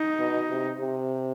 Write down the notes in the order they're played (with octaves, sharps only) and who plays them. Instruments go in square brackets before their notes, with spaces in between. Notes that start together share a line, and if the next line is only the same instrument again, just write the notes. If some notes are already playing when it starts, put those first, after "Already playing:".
Already playing: [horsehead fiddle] D#4
[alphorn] B2
C3
C3